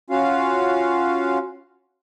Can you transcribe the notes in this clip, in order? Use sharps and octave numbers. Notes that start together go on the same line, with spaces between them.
C#4 F4 F#4 F5